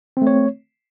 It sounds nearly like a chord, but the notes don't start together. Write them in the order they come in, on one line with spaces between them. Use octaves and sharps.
C4 A3 C#5